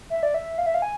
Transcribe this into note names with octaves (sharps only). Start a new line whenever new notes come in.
E5
D5
E5
F5
E5
F5
G#5